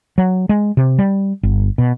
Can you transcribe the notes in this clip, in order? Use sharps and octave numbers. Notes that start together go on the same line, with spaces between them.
F#3
G#3
C3
G3
G1
B2